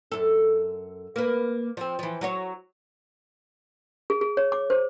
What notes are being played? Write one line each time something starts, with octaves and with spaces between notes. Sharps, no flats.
F#2 A4
A#3 B4
F3 C4
E3 F3
F#3 F#4 C#5
G#4
G#4
C#5
D6
C5